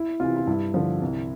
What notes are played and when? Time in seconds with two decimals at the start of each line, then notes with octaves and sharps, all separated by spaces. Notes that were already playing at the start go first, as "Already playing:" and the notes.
Already playing: E4
0.20 C3 E3 F4
0.36 F4
0.47 G2 E4
0.74 D3 F3
1.02 C2